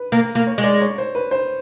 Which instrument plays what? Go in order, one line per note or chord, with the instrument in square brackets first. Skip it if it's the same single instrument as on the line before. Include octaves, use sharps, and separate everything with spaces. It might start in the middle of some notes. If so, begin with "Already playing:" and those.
Already playing: [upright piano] B4
[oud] A#3 [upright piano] A#4
[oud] A#3
[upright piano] C#5
[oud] G#3
[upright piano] D5
C#5
C5
B4
C5